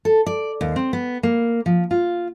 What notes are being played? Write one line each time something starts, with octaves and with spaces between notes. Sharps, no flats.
A4
D5
D#2
C4
B3
A#3
F3
F4